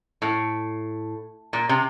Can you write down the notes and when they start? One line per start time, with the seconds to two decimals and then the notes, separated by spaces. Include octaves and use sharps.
0.22 A2
1.53 A#2
1.69 C3